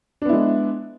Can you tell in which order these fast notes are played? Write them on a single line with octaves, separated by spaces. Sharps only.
D4 B3 E4 G#3